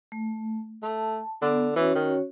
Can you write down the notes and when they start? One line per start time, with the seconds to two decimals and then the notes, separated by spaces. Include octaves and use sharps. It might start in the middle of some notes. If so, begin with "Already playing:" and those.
0.12 A3
0.83 A3 A5
1.42 D3 B3
1.76 E3 C#4 F#4 C#5
1.95 D#3